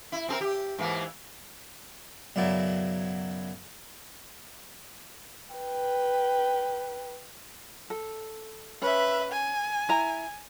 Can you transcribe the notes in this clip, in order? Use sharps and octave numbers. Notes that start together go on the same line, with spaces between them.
E4
C4 G#4 A#4
G4
G#2 E3 A#3
B1 F#2 C#3 F#3 E4 D5
B4 G5
A4
C#4 B4 E5
G#5
E4 A#5